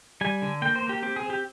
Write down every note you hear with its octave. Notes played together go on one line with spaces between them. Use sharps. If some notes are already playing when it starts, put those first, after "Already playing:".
G3 G#5
D3
A#3 G5
C5
A#3
G4
C4 G4
G#4
C4
G4